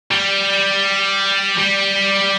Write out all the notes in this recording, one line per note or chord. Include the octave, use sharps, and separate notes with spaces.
G3
G3